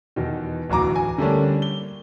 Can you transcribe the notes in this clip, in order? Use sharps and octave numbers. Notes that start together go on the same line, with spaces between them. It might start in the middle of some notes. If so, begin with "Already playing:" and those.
E2 B2 D#3
D1 E2 F#4 A#5 D6
G#5
D3 G3 A3 A#3 C#4 D4
G7